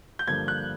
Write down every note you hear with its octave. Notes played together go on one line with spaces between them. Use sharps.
G6
G2 D3 F3 A#3 G#6
F#6